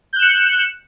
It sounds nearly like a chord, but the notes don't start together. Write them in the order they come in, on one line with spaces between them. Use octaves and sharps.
G6 F#6 E7 C#7